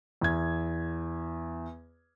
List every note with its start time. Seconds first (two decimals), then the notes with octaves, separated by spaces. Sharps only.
0.21 E2 G#6